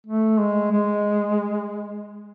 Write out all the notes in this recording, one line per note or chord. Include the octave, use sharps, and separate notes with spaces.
A3
G#3
G#3